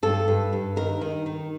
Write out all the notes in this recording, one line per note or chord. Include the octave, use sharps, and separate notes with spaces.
G2 A4
G2
G2
D#3 A#4
D#3
D#3